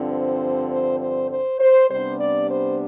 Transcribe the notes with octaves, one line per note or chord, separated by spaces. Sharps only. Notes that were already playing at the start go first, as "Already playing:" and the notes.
Already playing: G2 D3 F3 C4
C5
C5
C5
C5
C5
C3 G3 B3 D4 C5
D5
C5